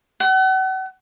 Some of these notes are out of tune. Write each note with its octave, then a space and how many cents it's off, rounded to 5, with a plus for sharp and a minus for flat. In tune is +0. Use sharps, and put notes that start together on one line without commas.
F#5 +40